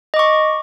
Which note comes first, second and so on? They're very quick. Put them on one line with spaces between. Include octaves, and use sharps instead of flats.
D#5 D6 C#6